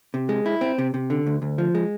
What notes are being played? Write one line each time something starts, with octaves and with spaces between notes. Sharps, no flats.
C3
G#3
E4
C4
C3
C3
D3
D2
D2
F3
G#3